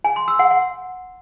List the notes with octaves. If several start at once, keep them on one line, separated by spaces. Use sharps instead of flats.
G#5
C6
E6
F#5
F#5